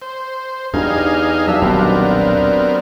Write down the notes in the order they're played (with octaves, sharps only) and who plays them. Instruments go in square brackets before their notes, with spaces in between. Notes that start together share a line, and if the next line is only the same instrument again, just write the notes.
[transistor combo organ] C5
[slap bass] E2 [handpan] D4 G4 [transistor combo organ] D#4 F5 G#5
[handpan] F#3 G4 F5 [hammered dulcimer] D4 [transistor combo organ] E5
[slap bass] D#1 B1 [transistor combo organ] B3 C4 A#4